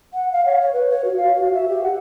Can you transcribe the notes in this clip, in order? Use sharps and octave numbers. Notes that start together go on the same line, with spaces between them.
F#5
F5
C#5
C#5
B4
C#5
F#4
F5
F#4
E5
G4
F#5